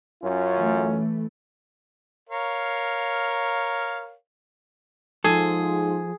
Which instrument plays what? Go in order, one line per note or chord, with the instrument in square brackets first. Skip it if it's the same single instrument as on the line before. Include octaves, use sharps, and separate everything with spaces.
[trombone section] F#2 C#4 F4
[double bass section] E3 A3
[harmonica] A#4 C#5 F5
[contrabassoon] G#2 [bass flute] F3 [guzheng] G#4 [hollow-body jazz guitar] A4